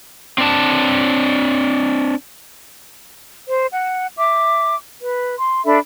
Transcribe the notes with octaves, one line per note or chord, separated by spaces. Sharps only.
C4 D4 A5
C5
F#5
E5 D6
B4
C6
D4 A4 E5 B5